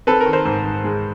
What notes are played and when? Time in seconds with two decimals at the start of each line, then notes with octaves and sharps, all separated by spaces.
0.07 C4 A4 B4
0.21 A#4
0.26 D#3
0.33 A#4 C5
0.45 G#2
0.65 G#2
0.84 G#3